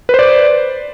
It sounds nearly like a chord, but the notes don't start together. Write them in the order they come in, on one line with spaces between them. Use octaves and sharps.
B4 C5 D5